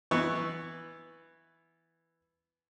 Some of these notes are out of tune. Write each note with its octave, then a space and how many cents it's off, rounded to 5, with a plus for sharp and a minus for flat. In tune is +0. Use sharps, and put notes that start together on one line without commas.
E3 +0 B3 +0 C#6 +0